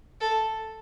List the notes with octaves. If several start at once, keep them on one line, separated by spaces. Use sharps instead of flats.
A4